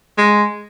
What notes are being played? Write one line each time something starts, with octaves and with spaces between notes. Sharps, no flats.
G#3